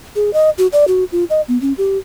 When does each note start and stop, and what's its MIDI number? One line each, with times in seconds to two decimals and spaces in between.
0.16 0.33 68
0.33 0.50 75
0.58 0.67 66
0.73 0.85 74
0.88 1.04 66
1.12 1.24 65
1.30 1.41 75
1.48 1.60 59
1.61 1.73 61
1.78 1.98 67